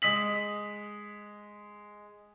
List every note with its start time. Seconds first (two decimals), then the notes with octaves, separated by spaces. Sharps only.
0.02 G#3 D#6 B6 F#7